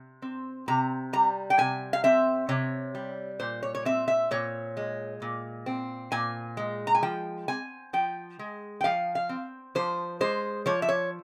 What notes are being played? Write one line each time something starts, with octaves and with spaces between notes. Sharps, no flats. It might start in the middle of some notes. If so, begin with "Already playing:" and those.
Already playing: C3
C4
C3 A#5
G3 A#5
G5
C3 G#5
F5
C4 E5
C3 C#5
G3
A#2 C5
C#5
C#5
C4 E5
E5
A#2 C#5
G#3
A#2
C4
A#2 G#5
G#3
A#5
G#5
F3 G5
C4 G#5
F3 G5
G#3
G5
F3 F5
F5
C4
F3 C5
G#3 C5
F3 C#5
E5
C#5